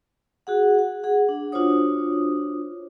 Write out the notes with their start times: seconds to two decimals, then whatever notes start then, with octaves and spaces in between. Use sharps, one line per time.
0.47 F#4 G#4 F#5
0.79 F#5
1.04 G#4 F#5
1.29 D4
1.52 D4 F4 F#4 C5 C#5 D#6